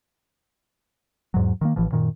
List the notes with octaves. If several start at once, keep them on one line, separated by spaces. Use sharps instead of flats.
E2 G#2 F#3
D#3 F#3 A#3
A1 E3 F3
F#2 A#2 D#3